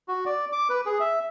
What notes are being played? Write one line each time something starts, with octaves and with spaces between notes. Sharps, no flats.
F#4
D5
D6
B4
G#4
E5